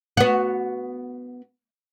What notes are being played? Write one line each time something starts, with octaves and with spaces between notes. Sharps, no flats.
B3 F#4